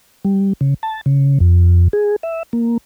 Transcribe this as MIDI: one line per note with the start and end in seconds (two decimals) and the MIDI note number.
0.25 0.53 55
0.61 0.74 49
0.83 1.01 81
1.06 1.38 49
1.40 1.88 41
1.93 2.16 68
2.23 2.43 76
2.53 2.78 58